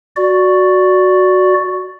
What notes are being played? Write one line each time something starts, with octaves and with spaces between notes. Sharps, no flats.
F#4 D5